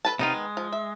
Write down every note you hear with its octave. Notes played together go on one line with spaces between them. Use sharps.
A4 B4 A5
C3 D#3 F#3 B3 D#4 F4
G#3
F3
E5